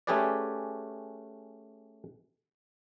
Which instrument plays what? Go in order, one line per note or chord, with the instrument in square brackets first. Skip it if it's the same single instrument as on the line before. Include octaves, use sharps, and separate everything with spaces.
[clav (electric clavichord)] A3 C#4 G4 G#4 B4 D5